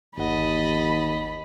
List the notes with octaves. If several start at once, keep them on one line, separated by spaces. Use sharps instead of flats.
G1 D#2 D#5 F#5 A5 B5